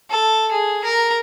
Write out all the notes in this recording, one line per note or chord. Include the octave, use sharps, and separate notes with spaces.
A4
G#4
A#4